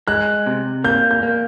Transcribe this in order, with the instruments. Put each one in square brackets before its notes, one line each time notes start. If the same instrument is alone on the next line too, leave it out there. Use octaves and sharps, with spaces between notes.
[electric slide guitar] G#3 [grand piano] F#6
[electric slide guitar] C3
[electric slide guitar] A#3 [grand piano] G6
[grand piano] G6
[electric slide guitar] A#3